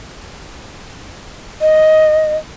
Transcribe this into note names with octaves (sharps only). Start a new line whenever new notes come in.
D#5